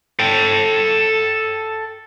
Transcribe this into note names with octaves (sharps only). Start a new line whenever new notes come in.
A4 G5